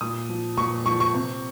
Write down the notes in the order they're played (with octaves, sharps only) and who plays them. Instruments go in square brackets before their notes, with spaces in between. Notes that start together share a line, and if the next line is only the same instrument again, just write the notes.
[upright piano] A#2 D#6
F3
A#2 C#6
F3 C#6
C#6
C3